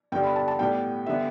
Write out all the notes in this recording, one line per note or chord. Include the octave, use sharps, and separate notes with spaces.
G2 D3 G3 B3 G5
B5
A5
A5
A2 G3 B3 G5
D3 G3 B3 E5